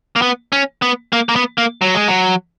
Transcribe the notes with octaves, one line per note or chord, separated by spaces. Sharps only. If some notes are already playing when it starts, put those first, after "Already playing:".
A#3
B3
C#4
B3
A#3
A#3
B3
A#3
F#3
G#3
F#3